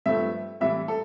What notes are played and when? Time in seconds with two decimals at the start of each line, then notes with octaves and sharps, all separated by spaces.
0.06 G2 F3 A3 E5
0.60 A2 E3 G3 E5
0.88 A4